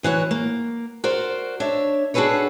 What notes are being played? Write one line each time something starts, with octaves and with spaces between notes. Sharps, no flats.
D2 E3 F#4 C#5
A#3
F#4 A#4 C5 D5
D4 C#5 E5
D4 F#4 G#4 A4 B4 C#5